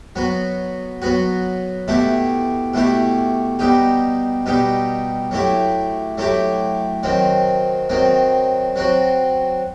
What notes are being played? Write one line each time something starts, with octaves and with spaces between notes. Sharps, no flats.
F#3 B3 F#4
F#3 B3 F#4
B2 A3 E4 G4
B2 A3 E4 G4
B2 G3 D#4 G4
B2 G3 D#4 G4
F#3 A3 E4 G4
F#3 A3 E4 G4
D#3 F#3 C4
D#3 F#3 C4
F#3 C4 F#4